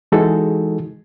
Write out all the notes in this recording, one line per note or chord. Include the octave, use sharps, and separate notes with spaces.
E3 G#3 D#4 F#4 G#4 A4